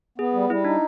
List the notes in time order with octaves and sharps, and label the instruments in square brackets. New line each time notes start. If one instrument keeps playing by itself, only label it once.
[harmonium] B3 [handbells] G#4
[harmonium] G3
[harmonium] G3 [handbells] E4
[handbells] D4 [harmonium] D#4